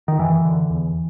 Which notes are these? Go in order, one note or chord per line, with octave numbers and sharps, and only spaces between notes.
D#3
F#2 E3
D3
E2